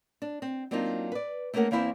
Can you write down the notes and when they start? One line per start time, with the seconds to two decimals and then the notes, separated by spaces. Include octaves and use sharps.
0.22 D4
0.42 C4
0.71 F#3 A#3 C4 D4 D#4 F4
1.12 B4 D5
1.54 A3 A#3 C#4 G#4 A#4 F#5
1.71 E2 A#3 C4 E4 C5